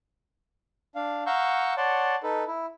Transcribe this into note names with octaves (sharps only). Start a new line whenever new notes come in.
D4 F5
F5 F#5 A#5 C#6 E6 G6
C#5 D5 F#5 A5 C6
D#4 A4 B4
E4